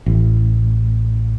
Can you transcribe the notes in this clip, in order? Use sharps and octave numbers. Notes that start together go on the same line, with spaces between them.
A1